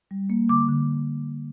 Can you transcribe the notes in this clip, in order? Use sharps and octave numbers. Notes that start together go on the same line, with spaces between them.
G3
A#3
D3 D6
D3